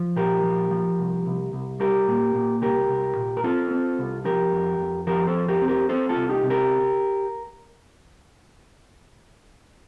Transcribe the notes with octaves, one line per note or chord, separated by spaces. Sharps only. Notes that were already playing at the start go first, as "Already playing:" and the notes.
Already playing: F3
A#2 G4 A#4
F3
F3
C2
C2
C2
G3 G4 A#4
A#2
A#2
C2 G4 A#4
C2
A#2
A#4
C4 F4 A4
C4
C2
F3 G4 A#4
F2
F2
F3 G4 A#4
A4 C5
F2
G4 A#4
C4
G4 A#4
C4 A4 C5
F4 A4
C2
D#4 G4
C3
G4 A#4